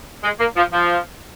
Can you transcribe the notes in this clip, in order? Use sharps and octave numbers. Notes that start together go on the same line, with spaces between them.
G#3
A#3
F3
F3